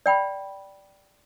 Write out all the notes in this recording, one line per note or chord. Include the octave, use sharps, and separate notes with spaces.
D5 G5 B5